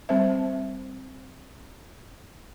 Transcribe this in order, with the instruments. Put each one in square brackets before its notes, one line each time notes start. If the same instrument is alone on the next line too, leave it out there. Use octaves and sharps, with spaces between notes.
[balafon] G3 C4 C5 E5